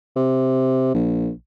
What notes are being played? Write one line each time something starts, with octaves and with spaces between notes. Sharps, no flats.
C3
A#1